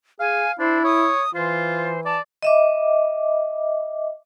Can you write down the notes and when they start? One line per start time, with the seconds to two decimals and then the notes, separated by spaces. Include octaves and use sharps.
0.20 G#4 F5 G#5
0.59 D4 E4 C5
0.84 C#5 D#6
1.35 E3 F4 C5
2.06 D5 A5
2.43 D#5 E5 D6